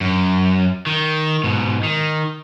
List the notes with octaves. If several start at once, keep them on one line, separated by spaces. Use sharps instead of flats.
F#2
D#3
G#2 B2
D#3